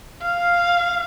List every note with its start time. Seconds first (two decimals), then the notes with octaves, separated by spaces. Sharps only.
0.22 F5